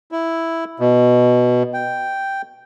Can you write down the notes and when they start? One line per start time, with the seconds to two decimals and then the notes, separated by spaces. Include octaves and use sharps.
0.12 E4
0.80 B2
1.74 G5